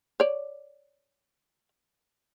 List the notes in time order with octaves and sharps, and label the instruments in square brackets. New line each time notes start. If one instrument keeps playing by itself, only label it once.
[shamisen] C#5 D5